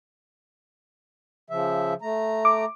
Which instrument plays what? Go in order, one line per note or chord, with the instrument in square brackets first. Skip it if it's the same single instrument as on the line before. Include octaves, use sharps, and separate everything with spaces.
[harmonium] C#3 F3 E5
A3 A#5
[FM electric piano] D6